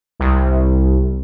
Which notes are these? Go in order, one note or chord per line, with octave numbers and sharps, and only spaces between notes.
C2